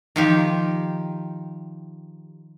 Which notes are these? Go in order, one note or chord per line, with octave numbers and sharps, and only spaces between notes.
D#3 F3 G4